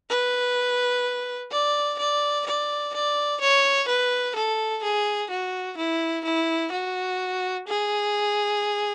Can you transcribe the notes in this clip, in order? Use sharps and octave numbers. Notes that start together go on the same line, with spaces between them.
B4
D5
D5
D5
D5
C#5
B4
A4
G#4
F#4
E4
E4
F#4
G#4